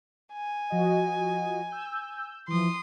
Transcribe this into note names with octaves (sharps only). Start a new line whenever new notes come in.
G#5
F3 F#4 D#5
E6 G6
E3 F3 C6 D#6